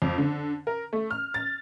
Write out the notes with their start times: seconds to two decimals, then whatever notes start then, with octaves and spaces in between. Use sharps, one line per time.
0.02 F2
0.18 D3
0.67 A#4
0.93 A3
1.11 F6
1.34 A6